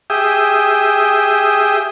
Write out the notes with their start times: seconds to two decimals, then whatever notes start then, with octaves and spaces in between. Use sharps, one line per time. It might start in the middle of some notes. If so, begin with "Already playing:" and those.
0.10 G4 G#4 E5 G5 D#6